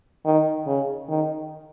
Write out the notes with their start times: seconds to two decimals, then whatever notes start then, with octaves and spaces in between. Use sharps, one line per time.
0.26 D#3
0.67 C#3
1.09 D#3